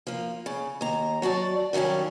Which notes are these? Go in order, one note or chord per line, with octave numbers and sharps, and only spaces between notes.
F3 A#3
C#3
D#2 A#5
F#3 F#4 D5 A5
G2 D#3 F#3 C#4 D4